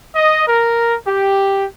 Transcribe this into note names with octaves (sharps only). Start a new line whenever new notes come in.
D#5
A#4
G4